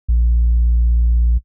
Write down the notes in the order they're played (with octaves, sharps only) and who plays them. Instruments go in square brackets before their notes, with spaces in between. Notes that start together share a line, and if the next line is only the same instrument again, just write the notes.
[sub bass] A#1